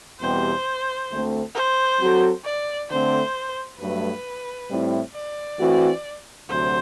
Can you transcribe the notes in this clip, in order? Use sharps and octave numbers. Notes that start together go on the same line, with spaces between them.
E2 B2 G3 C4 G4 C5
D2 D3 A3 C4
C5
F#3 C4 F#4 A4
D5
D3 A3 C4 C5
G2 F#3 A3 B4
A2 G3 C4 E4
D5
E3 A3 C4 F#4
D2 C3 F#3 C5